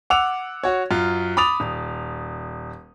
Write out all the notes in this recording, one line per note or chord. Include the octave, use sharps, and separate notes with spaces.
F#5 D6 E6 F7
F#4 C#5
F#2 F4
B5 D6 D#6 A6 F7
D#1